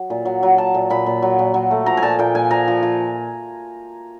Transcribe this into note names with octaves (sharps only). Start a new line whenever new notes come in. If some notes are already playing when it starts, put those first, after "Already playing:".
Already playing: F#3
A#2
F#3
F#3
F#3 A5
A#2
A#2 B5
A#2
F#3
A#2
F#3
A3
F3 A#5
G#5
A#2 A5
A#2 G5
A#2 G#5
F3 A#5
F3
F3